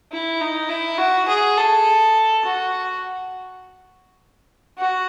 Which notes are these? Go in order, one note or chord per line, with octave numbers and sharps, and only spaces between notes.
E4
D#4
E4
F#4
G#4
A4
F#4
F#4